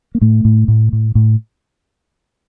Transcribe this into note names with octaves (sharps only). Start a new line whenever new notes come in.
A#3
A2 A3
A2
A2
A2
A2